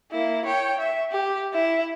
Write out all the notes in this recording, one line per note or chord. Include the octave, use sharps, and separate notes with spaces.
A#3 E4
C#5 G5
E5
G4
E4 E5